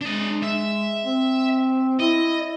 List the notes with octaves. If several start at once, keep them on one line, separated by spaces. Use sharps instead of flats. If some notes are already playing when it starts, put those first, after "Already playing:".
G#3 D4 D#5
E5
C4
E4 D#5